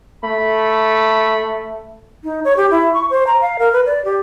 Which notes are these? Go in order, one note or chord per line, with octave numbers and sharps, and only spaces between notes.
A3 B5
D#4
C#5
G4
E4
C#6
C5
A#5
F5
A#4
B4
D5
G4